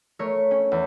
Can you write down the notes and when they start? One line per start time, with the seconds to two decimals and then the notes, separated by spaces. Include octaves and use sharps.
0.19 A3 A#4 C#5
0.51 C#4
0.72 E2